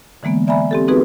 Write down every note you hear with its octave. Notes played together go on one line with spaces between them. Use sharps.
D3 E3 G#3 A#3 B3
D5 E5 G#5 A#5 B5
C4 G4 A4
B3 C4 D#4 F#4 G#4 B4